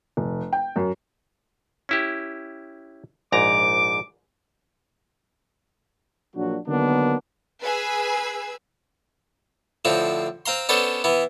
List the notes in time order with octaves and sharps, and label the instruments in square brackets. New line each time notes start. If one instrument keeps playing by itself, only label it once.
[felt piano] F1
G5
F#2
[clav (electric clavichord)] C#4 E4 G4
[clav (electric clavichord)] A#1 G#2 A#5 [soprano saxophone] D6
[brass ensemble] A#1 A#2 F#3 D4 F#4
D3 D#3 F#3 A#3 B3 D4
[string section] G#4 B4 G#5 E6
[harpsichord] A2 D3 F3 C4
C4 F5 A#5 C6
B3 C#4 D4 A4 C5
E3 B3